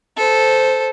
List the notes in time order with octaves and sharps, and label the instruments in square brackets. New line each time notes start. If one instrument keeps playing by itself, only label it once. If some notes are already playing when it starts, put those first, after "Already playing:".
[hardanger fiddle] A4 C5